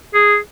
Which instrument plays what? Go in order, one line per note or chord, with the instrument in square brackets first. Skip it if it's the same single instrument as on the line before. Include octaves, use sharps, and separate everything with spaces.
[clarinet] G#4